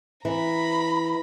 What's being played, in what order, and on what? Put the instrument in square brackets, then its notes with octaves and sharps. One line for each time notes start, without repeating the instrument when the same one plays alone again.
[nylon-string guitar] E3 [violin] A#5 B5